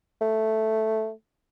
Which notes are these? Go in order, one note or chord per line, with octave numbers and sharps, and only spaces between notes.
A3